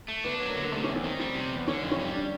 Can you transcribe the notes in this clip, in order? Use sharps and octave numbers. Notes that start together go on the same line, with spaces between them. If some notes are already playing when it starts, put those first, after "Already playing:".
A3
B3 D4
F#3
A#3
D3
A#3
C3 A3
C#4
E2
C4
D#3
G3 C4
C3
E2
D3 C#4
F2
C#4
G3
D4